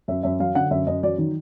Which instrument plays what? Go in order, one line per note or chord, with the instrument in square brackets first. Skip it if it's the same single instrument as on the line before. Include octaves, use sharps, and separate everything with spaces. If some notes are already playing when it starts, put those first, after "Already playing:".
[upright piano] F#2 E5
F#2 E5
F#3 F5
D3 F#5
F#2 E5
F#2 D#5
F#3 D5
D#3